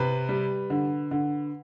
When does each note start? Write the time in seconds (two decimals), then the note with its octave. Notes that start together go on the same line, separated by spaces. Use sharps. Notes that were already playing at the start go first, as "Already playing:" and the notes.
Already playing: C3 B4
0.29 G3
0.70 D3
1.11 D3